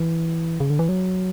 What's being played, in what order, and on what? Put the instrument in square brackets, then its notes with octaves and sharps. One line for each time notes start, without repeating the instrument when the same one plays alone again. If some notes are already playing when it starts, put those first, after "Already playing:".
Already playing: [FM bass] E3
C#3
D3
E3
F#3